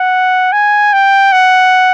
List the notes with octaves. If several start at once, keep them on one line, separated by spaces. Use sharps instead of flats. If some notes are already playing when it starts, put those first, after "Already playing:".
Already playing: F#5
G#5
G5
F#5